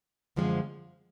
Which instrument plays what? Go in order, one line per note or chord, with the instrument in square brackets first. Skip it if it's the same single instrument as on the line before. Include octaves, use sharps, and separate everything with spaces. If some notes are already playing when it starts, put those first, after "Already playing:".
[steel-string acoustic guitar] F#2 D3 F3 G#3 C4